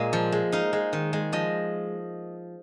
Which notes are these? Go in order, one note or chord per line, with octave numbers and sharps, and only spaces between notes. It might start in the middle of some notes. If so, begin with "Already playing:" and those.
Already playing: A#2 G#3 A#3 F5 G#5
F3
G#3
D#4 F5
G#3
D#3
G#3
F3 D#5